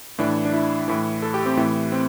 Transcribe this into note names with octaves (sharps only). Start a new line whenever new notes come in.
A2 E3 D4
D4
E4
A2 E3
A4
G4
C4
A2 E3
C4